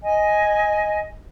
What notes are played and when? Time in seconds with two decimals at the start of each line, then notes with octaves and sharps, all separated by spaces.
0.03 D#5 G#5